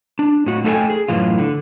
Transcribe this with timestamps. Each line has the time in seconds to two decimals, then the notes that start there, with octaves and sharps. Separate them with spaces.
0.19 D4
0.46 A2 F#4
0.64 A3 D#4 A4 E5 G5 G#5
0.90 G#4
1.08 F#2 A2 E3 F4
1.39 D3